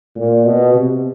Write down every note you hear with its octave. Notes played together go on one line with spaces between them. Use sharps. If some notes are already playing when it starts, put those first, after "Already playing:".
A#2
B2
C3